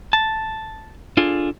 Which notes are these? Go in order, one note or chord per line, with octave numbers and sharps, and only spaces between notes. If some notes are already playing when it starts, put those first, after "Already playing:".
A5
D4 F4 G#4 A4